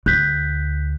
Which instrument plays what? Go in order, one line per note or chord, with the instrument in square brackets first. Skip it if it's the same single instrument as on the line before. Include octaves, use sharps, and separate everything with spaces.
[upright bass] D2 [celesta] F#6 G6 B6